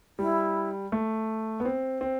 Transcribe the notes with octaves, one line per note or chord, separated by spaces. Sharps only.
G3 E4
A3
B3
C4
C4